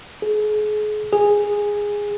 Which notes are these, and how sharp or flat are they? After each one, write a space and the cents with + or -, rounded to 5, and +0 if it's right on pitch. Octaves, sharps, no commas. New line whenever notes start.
G#4 +35
G#4 -10